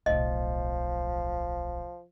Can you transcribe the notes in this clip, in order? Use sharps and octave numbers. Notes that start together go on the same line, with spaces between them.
D1 B1 F3 D#5